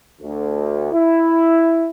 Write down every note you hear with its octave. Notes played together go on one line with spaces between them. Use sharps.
D2
E4